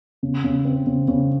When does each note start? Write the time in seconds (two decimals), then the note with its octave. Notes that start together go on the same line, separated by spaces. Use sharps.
0.23 C#3
0.44 C#3
0.65 C4
0.87 C#3
1.08 C#3